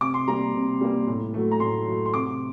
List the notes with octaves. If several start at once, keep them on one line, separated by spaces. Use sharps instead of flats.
C3 D6
C6
G3 A#3 A#5
C3
G3 A#3
A2
F#3 A3
A#5
A2 C6
F#3 A3
C6
C3 D6